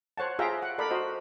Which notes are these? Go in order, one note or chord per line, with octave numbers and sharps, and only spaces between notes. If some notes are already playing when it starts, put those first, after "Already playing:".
C5 C#5 F#5 A5
F4 G#4 E5 F5 G5 A#5
F#5
A4 A#4 D5 B5
F#4 C5 D#5